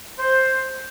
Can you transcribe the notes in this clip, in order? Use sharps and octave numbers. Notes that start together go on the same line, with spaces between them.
C5